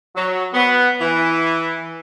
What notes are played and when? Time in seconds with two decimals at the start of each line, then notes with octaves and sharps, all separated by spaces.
0.16 F#3
0.54 B3
1.01 E3